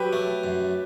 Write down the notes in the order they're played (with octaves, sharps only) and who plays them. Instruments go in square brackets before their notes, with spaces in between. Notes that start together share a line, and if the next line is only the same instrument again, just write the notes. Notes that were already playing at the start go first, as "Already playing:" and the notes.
Already playing: [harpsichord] F#3 [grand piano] G4 B4
[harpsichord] A3
F#2